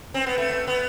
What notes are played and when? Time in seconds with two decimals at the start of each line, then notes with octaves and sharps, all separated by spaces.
0.14 C4
0.26 B3
0.38 A3
0.67 B3